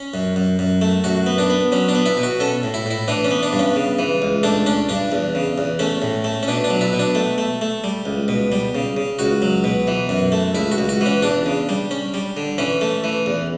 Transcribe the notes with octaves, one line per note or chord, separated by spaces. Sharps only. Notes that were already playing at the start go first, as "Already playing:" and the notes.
Already playing: C#4
F#2
F#2
F#2
A3
F#2 F#4
B3
D4
B3
F#3 C#4
D4
B3
E4
B2
F#4
C#4 A4
A2
E4
A2 E4
E3 D4
C#4
B3
D4
G2
C#4
C#3
E3
C#2
A3 D4
C#4 D4
G2 D4
E2
C#3
E2
A3 C#4
A2
A3
C#4
B2 D4
D4
F#3
E4
B2
D4
A3
A3
A3
G3
C#2
B2
G3
C#3
C#3
C#2 F#4
F#3
B2
E3
F#2
A3
C#2 E4
F#4
C#2
F#4
E3 C#4
E2 D4
C#3
G3
C#4
G3
D3
E3 C#4
A3
E3
E2